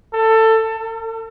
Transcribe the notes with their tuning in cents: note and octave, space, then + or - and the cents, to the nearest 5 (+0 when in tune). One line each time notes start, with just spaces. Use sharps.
A4 +20
A4 +45